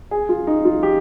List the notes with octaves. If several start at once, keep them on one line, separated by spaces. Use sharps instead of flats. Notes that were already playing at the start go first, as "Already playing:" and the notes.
G#4
F4
D#4
F4
G4